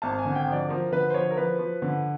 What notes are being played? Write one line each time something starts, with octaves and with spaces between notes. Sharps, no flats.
G#1 A5
G#5
D3
G5
F3 D5
F3 A#4
D3 B4
C5
F3 C#5
A#4
F3 B4
F3
D3